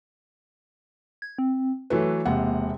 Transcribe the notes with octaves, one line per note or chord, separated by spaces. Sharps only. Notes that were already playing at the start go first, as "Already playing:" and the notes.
G#6
C4
E3 F#3 A3 B4
E1 C3 A#3 F#5